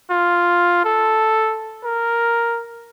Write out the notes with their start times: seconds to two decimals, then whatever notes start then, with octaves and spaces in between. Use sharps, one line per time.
0.10 F4
0.84 A4
1.85 A#4